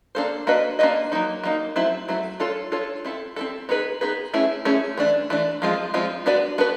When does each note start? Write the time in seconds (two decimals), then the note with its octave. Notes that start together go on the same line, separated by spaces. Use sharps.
0.15 A#3 D4 F4 A4 C5
0.47 A#3 D4 F#4 B4 D#5
0.79 A#3 D4 F#4 B4 D#5
1.12 F#3 A#3 D#4
1.44 F#3 A#3 D#4
1.76 F#3 A3 C4 E4
2.08 F#3 A3 C4 E4
2.40 D4 F4 A4 C#5
2.72 D4 F4 A4 C#5
3.05 C4 E4 A4
3.36 C4 E4 A4
3.69 B3 D#4 G#4 B4
4.01 B3 D#4 G#4 B4
4.34 A3 C#4 E4 G#4
4.65 A3 C#4 E4 G#4
4.98 E3 A3 D4
5.30 E3 A3 D4
5.62 F3 G#3 C4 F4
5.94 F3 G#3 C4 F4
6.26 B3 D4 F#4 B4 D5
6.58 B3 D4 F#4 B4